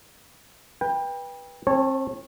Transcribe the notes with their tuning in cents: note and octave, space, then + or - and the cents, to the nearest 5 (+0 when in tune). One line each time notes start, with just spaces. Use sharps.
B4 -20 G5 +25
C4 +30 C#5 -20 A5 +0